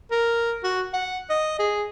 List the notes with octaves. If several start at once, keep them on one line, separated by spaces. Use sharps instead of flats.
A#4
F#4
F#5
D#5
G#4